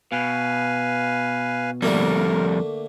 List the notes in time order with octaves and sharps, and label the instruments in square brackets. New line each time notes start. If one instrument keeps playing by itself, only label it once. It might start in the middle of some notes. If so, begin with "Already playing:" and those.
[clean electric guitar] B2 [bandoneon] B4 F5 G#5
[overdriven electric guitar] F2 G3 [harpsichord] D3 A3 A#3 [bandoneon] A#4